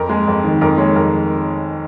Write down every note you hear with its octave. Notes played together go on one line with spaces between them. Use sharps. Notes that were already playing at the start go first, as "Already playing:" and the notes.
Already playing: F2 A#4
G#3
F2
D#3
F2 A#4
G#3 C#5
F2 A#4